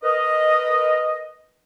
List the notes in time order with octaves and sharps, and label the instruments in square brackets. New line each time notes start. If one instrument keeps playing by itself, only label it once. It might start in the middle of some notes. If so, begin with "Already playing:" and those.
[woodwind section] A#4 B4 D#5